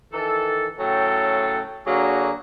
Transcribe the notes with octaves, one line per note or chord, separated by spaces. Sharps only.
D#3 E3 A4
A2 C#3 F#3 A4 G5
D3 F#3 A#3 F#4 G#4